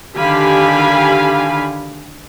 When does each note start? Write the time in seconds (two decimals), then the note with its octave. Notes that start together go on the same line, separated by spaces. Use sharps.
0.17 D3 D#3 G4 F5 G#5 B5